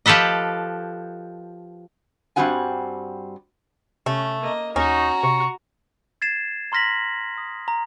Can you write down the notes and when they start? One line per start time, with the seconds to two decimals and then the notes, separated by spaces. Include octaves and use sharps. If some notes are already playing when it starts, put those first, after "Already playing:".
0.06 F3 G4 A4 B4 D#5
2.36 G2 G3 C4 F#4 F#5 G#5
4.06 C3 A3 C#4
4.40 A#3 D#5
4.76 D#2 C#4 D#4 F#4 A#5
5.23 C3 C#6
6.22 G#6 A6 C7 E7
6.72 A#5 C6 F6 A#6 B6 F#7
7.38 D#6
7.68 A#5